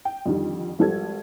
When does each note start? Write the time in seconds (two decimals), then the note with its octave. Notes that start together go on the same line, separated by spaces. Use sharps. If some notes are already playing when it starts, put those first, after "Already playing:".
0.05 G5
0.26 F2 D3 D#3 G3
0.79 G#1 F3 G3 A4 G#6